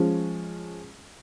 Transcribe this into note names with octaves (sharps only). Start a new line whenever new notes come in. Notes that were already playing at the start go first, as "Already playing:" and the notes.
Already playing: F3 G#3 C#4